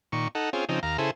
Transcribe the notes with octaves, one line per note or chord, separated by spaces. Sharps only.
A#2 D#3 C#6
D#4 A4 F#5
C4 C#4 F4 G#4
C#3 F3 C4 D#4
D#2 F5 A#5
C#3 E4 G#4 A4 C5